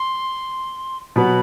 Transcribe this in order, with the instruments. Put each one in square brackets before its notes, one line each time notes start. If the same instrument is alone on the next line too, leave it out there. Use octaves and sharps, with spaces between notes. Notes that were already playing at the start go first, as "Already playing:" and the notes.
Already playing: [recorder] C6
[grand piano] B2 F#3 B3 [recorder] B5